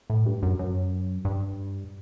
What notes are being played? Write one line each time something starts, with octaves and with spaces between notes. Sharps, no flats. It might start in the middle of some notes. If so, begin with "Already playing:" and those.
A2
G2
F#2
F#2
G2